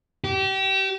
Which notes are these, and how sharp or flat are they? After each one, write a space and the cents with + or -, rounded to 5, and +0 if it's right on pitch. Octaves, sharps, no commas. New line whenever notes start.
G4 -30